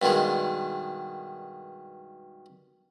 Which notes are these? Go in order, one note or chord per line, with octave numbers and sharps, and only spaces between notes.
G2 B2 D#3 G#3